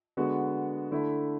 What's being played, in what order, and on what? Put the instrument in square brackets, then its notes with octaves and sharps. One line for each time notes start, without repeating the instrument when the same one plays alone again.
[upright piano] D3 G#3 B3 F#4
D3 A3 E4